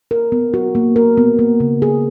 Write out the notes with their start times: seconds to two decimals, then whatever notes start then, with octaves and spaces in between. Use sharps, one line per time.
0.11 A#4
0.32 B3
0.54 F#4
0.75 A#3
0.96 A#4
1.17 B3
1.39 A#3
1.60 C#3
1.82 G#4